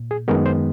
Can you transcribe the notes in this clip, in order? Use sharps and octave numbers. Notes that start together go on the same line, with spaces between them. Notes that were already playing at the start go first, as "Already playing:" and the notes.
Already playing: A#2
G#4
F#2 D#3 G#3 B3 A#4
C5